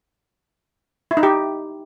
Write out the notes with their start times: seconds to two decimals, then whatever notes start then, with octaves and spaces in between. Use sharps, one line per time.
1.11 E4
1.17 D#4
1.23 G4